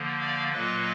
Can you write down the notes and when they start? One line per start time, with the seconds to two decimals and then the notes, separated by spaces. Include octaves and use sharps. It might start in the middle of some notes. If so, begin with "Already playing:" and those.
Already playing: D3 F3 A#3
0.20 D5 F5
0.53 A#2 F#3 A#3 B4 D#5